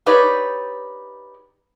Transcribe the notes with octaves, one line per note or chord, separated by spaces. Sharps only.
D#4 G4 B4 C#5 D5